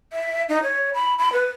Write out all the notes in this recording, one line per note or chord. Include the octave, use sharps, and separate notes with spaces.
E5
D#4
C#5
B5
B5
B4